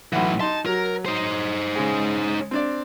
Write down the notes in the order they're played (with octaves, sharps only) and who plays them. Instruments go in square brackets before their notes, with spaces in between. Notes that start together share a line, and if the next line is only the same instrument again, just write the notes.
[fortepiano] B1 F#5 [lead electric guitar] A2 E3
[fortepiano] D#4 C6 [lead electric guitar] A5
[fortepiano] F#3 [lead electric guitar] A#4
[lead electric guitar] D#4 C5
[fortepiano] C#3 G#3
C4 D4 D5